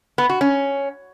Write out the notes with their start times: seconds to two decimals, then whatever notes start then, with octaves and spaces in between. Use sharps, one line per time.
0.18 B3
0.29 F#4
0.41 C#4